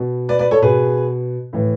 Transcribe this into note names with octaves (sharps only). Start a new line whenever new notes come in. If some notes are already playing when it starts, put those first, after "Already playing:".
Already playing: B2
B4 D5
B4 D5
A4 C#5
B2 G#4 B4
A2 E3